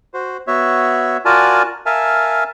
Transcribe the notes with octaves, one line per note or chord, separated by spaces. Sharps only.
F#4 C5
B3 F#4 C#5 E5
F4 F#4 A#4 D5 G#5 A5
A#4 E5 F5 G#5 A5